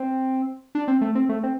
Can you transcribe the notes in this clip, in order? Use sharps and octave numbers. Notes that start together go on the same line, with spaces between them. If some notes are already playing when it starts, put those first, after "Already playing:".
Already playing: C4
D4
C4
A3
C4
A3
C4